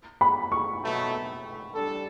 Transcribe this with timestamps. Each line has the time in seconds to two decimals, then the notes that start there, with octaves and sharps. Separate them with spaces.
0.21 B5
0.52 C#6
0.82 B2 F#3 A3
1.74 G3 D4 A4